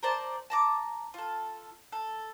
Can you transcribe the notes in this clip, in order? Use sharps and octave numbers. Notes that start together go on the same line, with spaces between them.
A#4 C5 D5 A5
A5 A#5 D6
F4 A4
A4